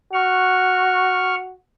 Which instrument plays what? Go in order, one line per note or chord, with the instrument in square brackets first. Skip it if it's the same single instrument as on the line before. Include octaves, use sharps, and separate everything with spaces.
[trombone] F#4 [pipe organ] C#6 F6